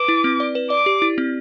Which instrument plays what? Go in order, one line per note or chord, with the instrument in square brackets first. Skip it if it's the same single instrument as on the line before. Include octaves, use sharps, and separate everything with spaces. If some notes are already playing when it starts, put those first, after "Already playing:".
Already playing: [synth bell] B4 [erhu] D6
[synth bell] E4
C4
D5
B4
[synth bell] D5 [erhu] D6
[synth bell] G4
E4
C4